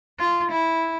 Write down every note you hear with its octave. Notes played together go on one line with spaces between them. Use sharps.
F4
E4